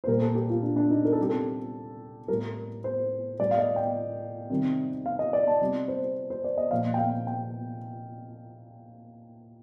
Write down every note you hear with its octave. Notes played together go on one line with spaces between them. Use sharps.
C5
A#2 G3 A#4
A4
G4
F4
D4
D4
D#4
A#4
A4
C3 G3 G4
A4
A2 G3 A#4
C5
A2 G3 D5
F5
D#5
G5
C3 D#3 G3
F5
D#5
D5
A5
C3 G3
C5
C5
D5
D#5
A#2 F3 F5
G5
F5
G5